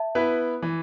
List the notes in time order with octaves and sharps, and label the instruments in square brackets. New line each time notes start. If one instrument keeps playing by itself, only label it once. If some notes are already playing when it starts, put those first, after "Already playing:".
Already playing: [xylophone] E5 A5
[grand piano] B3 E4 B4
E3